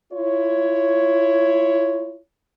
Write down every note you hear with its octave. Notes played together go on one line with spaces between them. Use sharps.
E4 F4 C#5